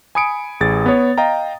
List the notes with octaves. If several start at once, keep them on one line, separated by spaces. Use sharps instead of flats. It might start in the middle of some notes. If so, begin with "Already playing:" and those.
G#5 B5 D#6 C#7 D7
A1 G#4 A6
B3 C#5
D#5 F5 G5 A#5